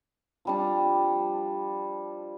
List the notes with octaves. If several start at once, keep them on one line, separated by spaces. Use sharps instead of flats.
F3 G3 D4